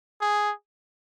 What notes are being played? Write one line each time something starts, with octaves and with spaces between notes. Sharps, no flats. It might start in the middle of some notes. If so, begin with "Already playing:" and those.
G#4